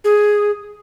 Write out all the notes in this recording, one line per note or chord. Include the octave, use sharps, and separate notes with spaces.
G#4